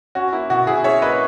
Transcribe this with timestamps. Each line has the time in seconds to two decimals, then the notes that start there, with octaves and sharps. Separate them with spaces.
0.15 C#4 F#4
0.32 A#3 E4
0.50 B2 F#4
0.67 B2 E4 G#4
0.84 C#4 C#5 E5
1.02 A#3 B4 D#5